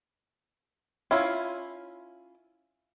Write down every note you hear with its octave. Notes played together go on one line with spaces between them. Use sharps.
C#4 E4 F4